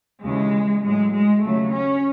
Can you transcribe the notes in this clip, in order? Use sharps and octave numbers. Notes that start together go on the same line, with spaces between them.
D#2 C#3 E3 G#3
A2 F#3 G#3
G#3
D#2 C#3 F#3 A3
C#4